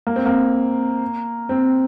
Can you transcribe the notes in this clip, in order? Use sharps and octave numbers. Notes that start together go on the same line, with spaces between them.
A#3
C4
A#3
C4